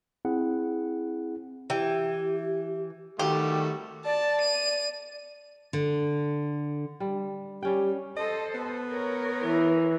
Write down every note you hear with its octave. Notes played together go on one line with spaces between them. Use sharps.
C4 E4 G#4 F#5
E3 G4 G5
D#3 G3 A3 F#4 G4
D5 A5
D#7
D3
G3
G3 C#4 G4 G5
A4 C5 D#5
B3
A#4 C#5
E3